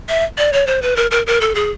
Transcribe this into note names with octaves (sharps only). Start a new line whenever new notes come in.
E5
D5
C#5
C5
B4
A#4
A#4
A#4
A4
G#4